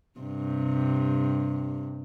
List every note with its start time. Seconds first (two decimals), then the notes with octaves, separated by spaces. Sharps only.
0.20 G2 C3